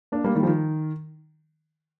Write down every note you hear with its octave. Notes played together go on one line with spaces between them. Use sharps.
A#3 D4
G3 A#3
D#3 G3
F3
D#3